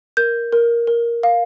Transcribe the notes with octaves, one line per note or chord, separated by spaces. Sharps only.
A#4 G6
A#4
A#4
F5